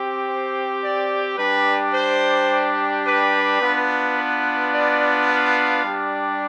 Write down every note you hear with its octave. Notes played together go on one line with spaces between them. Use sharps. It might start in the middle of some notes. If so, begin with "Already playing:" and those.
Already playing: C4 G4
C5
D5
G3 D4 G4 B4
C5
B4
B3 D4 F4
B4
D5
F5
G3 D4 G4